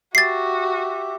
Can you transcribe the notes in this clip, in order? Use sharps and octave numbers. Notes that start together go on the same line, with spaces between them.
F#4 G4 E5 A6 C7